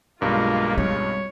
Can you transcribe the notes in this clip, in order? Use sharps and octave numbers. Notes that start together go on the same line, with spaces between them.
B1 G2 G#3 A#3 F4
G3 C4 C#5